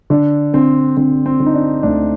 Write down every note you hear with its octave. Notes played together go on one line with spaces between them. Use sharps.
D3 D4
D3 C4
D3 C4
C4
D3
D#4
D4
D2 D4